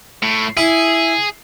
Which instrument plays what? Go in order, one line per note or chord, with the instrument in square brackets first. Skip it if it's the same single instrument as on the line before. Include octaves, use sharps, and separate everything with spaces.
[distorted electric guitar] A2
[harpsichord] E4 [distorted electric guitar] G#4